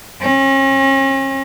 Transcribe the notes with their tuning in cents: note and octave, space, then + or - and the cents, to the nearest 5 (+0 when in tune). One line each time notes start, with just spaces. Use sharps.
C#4 -40